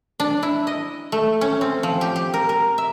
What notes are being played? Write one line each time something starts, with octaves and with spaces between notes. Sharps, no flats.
D4
E4
D#5
A3
C#4
C4
F3
G4
G4
A#4
A#4
E5